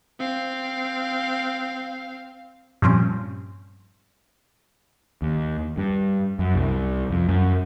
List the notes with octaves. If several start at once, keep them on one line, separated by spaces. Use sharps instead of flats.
C4 F5
G2 A#2 F3 C4 C#4
D#2
G2
F#2
C2
F2
F#2